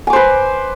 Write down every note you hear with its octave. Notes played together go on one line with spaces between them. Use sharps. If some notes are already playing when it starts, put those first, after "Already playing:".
B4 C5 G#5 D6